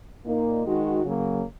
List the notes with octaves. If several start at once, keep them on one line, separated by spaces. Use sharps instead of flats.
A#2 A#3 D#4
D#3 G#3 D#4 F#4
C#3 F#3 A#3